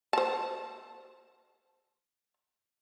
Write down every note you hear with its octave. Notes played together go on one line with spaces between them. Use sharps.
C5 A5